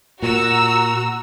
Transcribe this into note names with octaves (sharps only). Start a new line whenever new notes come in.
A#2 F#4 A#5 E6